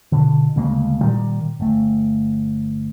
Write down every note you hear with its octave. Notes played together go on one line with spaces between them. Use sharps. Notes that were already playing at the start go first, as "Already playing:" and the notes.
B2 D3
D2 C#3 G#3 A#3
A#2 D#3 G3
G1 A3